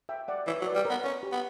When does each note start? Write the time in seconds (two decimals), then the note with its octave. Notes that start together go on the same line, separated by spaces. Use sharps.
0.09 E5 G5
0.28 D5 F#5
0.47 E3 C#5 E5
0.61 F#3
0.66 B4 D5
0.76 G3
0.85 A#4 C#5
0.90 B3
1.04 C#4 A#4
1.23 G4
1.32 B3